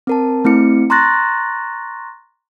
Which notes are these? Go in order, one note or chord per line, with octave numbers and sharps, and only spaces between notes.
C4 A#4 A5
A3 C4 E4 C#7
A#5 C6 C#6 F#6 A6 A#6